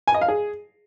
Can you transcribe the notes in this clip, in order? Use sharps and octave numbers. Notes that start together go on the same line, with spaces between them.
G#5
D#5
F5
G#4